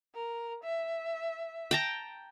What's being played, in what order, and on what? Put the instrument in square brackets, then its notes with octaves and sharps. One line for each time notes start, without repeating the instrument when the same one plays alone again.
[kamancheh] A#4
E5
[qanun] G5 A5 A#5